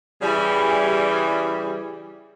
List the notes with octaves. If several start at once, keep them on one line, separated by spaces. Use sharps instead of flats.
C#3 E3 G3